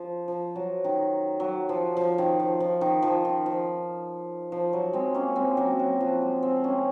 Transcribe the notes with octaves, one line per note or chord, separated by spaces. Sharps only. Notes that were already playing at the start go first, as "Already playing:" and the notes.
Already playing: F3
F3
F#3
D#3
F#3
F3
F3
D#3
F3
F3
D#3
F3
D#3
F3
F3
F#3
G#3 C4
A#3 C#4
G#3 C4
F#3 A#3
F#3
F3
G#3
G#3 C4
A#3 C#4